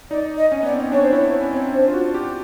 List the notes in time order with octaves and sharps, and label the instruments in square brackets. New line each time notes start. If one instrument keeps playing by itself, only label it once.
[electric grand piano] D#4 [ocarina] D5
[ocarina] D#5
[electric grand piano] C#4
[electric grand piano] B3 [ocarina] D5
[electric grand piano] C4
[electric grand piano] D4 [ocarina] C#5
[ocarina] C5
[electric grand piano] E4 [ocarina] C#5
[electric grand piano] C#4
C4
[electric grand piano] D4 [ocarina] C5
[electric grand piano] F4
F#4
G4